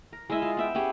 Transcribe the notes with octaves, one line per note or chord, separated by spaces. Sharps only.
A#4
G#3 E4 D#5 E5
F4
B3 E5 G5
B3 C#4 G4 G#4